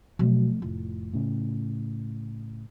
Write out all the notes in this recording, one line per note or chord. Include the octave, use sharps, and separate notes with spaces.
B2 F3 F#3 G#3 A3
F1 A2 F4
A2 C#3